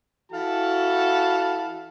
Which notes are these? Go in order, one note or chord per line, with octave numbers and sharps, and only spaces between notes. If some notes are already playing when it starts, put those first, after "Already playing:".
E3 F#4 A4 F5 F#5 A5